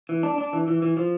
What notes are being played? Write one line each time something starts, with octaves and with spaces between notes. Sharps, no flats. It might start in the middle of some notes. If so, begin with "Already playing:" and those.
E3
D4
D4
E3
E3
E3
F3